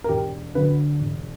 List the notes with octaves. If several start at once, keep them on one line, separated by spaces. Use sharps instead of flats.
A#4
E1 G4
D2 D3 F#3 B4
E1